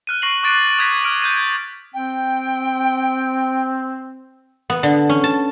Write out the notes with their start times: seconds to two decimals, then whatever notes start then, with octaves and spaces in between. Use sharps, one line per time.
0.07 F6 F#6 D#7
0.22 C#6 A#6 C7 D#7 F#7
0.43 C#6 D6 F#6 A6 D7 D#7
0.79 D#6 F#6 G#6 A#6 B6
1.05 F6 D7
1.22 G6 G#6 D#7
1.94 C4 G5
4.70 B3
4.83 D3
5.09 C#4
5.24 A5